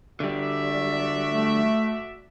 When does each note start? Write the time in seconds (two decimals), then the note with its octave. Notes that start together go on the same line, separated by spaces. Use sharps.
0.20 D3 G3 F#4 D5 E5
1.27 A3